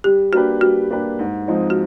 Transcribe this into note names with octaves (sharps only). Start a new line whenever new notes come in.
G3 G4
A#3 D4 F#4 G4 B4
G3 F#4
A#3 D4 G4 B4
G#2
F3 G#3 C4 D#4
F#4